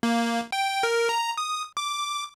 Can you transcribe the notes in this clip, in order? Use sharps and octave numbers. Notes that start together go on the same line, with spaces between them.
A#3
G5
A#4
A#5
D#6
D6